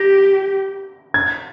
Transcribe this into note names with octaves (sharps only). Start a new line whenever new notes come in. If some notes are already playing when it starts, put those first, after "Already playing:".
Already playing: G4 A#6
G#6